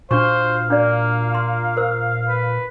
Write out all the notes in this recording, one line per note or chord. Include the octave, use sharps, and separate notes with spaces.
A#2 D4 F#4 C5 F5 C#6
A#3 D4 F#4 D5
A#5 C6
A#4 C5 E6
B4